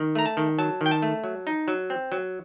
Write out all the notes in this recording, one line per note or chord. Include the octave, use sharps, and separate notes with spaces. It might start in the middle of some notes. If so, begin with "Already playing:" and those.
Already playing: D#3
A3 A#5
A5
D#3
F#3 A5
D#3
G5
A5
A3
F#3
D#4
F#3
C4
F#3